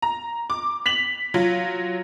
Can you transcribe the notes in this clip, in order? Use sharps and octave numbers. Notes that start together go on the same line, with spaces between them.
A#5
D6
B6 F7 F#7
F#3 F4